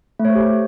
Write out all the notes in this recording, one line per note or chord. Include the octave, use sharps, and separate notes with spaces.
A3
C#5
C5
G4